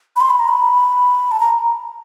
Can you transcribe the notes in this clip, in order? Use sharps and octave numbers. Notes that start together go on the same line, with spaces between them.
B5
C6
B5
A#5
B5
A5
A#5